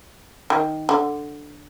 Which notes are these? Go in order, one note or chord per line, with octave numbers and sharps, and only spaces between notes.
D#3
D3